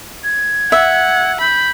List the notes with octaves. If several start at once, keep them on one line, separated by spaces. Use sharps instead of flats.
G#6
E5 F#5
B5 G6